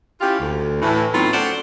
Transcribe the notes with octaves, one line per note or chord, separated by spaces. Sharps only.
C#4 E4 F4 G4
D2
A2 E3
A2 F#3 B3 C4 D#4 F4
D2 A3 C#4 C5 D5 F#5